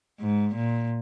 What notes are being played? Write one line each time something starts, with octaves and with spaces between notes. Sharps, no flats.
G#2
A#2